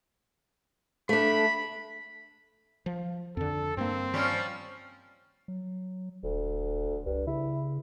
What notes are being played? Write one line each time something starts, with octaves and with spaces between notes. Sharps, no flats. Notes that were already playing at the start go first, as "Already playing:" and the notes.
A3 D4 B5
F3
F2 D3 A4
G2 A#3 C4
F3 G3 C#4
F#3
D#1 D2
C2 G2
C#3 E4